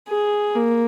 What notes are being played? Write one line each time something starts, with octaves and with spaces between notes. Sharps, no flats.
G#4
A#3